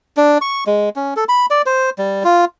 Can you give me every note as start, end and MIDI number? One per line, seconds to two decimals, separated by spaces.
0.17 0.38 62
0.41 0.64 85
0.67 0.89 56
0.96 1.14 61
1.16 1.24 69
1.29 1.46 83
1.50 1.62 74
1.66 1.90 72
1.98 2.23 55
2.24 2.45 65